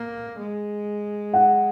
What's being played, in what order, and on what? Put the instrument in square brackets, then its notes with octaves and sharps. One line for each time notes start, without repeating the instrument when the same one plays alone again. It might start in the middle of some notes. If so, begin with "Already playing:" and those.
Already playing: [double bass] A#3
G#3
[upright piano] F#5